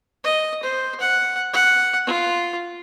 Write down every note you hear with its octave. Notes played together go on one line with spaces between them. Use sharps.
D#5
C5
F#5
F#5
F4